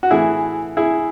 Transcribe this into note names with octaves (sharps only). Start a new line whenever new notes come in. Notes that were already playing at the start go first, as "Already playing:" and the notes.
F#4
A2 E3 E4 G#4
E4 G#4